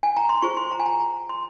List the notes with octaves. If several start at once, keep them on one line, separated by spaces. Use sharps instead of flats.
G#5
A#5
C6
F4 G#4 C5 C#6
C6
A#5
G#5
A#5
A#5
C6